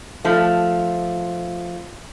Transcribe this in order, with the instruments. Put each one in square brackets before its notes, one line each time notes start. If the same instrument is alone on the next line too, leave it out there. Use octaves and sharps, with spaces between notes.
[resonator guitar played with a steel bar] F3 A3